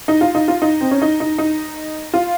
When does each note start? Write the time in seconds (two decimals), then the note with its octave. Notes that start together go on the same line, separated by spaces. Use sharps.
0.08 D#4
0.21 F4
0.35 D#4
0.48 F4
0.62 D#4
0.81 C4
0.91 C#4
1.02 D#4
1.20 D#4
1.38 D#4
2.14 F4